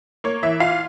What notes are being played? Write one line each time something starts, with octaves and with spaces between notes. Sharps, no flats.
A#3 C#5
E3 E5
F4 F5